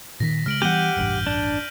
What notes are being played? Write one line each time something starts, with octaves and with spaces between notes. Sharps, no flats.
A#2 D#3 A#6 B6
C#3 G#3 F6 D7 F#7
E3 G3 B3 G4 F#5 G6 D#7 G7
E1 A1 G2 D7 F#7
D4